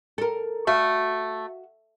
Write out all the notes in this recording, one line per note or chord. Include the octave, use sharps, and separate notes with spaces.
A4 A#4
A3 F#4 F5